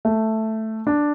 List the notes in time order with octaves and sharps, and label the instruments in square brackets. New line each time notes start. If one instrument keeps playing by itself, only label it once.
[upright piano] A3
D4